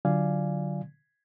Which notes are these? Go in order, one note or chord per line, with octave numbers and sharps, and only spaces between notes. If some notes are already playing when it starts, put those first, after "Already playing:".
D3 F#3 F4 D5 F5 G#5